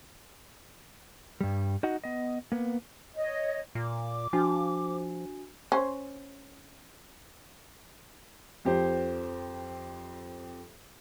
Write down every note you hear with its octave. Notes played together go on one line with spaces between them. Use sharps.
G2 G3
D#4 F#4 D#5 F#5
B3 D#5
A#3 B3
C#5 D#5
A#2 D6
F3 D4 F#4 G#5
C#4 C5
F2 G4 C5